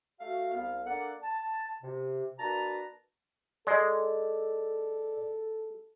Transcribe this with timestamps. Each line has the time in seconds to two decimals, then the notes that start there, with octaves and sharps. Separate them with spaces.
0.21 A3 F#4 F5
0.52 C2 B3 F5
0.86 A#3 D4 A4 D5 F#5
1.23 A5
1.83 C3
2.39 A#3 D4 F#4 B4 A5 A#5
3.67 G#3 A4 D5